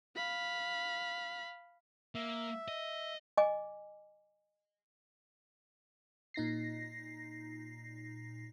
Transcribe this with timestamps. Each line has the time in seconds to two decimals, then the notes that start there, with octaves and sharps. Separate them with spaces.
0.16 F5 B5
2.15 A#3 E5
2.68 D#5
3.37 D#5 G#5 D6
6.34 A#2 D#4 A#6 C7